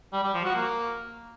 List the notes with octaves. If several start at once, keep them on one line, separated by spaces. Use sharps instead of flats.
G3
G3
F3
F#4
A#3